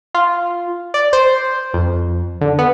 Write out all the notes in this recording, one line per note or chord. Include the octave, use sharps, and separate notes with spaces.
F4
D5
C5
F2
D3
B3